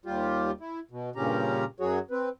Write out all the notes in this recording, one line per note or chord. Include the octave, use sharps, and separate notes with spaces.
D#2 G3 F4 G4
E4
B2
G2 A#2 C#3 C#4 G4 A#5
F#2 F#3 F#4 G#4 C#5
C4 B4